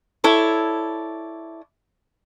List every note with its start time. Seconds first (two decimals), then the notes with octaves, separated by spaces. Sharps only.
0.24 E4 A4 C#5 D5